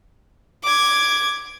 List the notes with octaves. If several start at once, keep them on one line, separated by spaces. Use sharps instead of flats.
D6 G#6